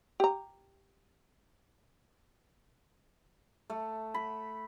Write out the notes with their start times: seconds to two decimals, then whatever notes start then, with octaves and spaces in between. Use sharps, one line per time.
0.20 G4 A#5
3.70 A3
4.14 B5